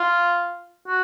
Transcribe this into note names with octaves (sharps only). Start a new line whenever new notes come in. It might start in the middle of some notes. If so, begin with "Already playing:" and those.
Already playing: F4
F#4